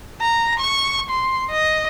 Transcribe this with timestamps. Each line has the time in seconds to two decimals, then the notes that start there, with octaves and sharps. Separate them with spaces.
0.21 A#5
0.59 C#6
1.10 C6
1.51 D#5